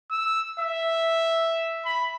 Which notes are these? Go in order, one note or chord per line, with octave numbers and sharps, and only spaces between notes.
E6
E5
B5